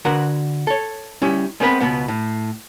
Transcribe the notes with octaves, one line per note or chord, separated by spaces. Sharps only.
D3 F#4 A#4 B4 F#5
A4 C#5
G3 C#4 E4 G4
G#3 B3 C4 A#4 B4 B5
C#2 B2 B3 F#5
A2